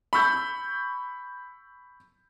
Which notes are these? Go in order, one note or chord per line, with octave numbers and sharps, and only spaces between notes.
B5 C#6 E6 G6